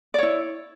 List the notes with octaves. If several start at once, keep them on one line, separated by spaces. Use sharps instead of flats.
E4 C#5 D5